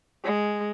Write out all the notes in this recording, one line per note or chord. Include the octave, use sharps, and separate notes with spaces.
G#3